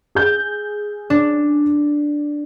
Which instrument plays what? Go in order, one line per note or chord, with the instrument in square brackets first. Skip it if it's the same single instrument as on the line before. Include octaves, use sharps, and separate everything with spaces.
[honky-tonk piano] G#4 G6
[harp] D4